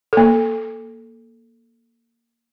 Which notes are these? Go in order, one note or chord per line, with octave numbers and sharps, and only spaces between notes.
A#3 A4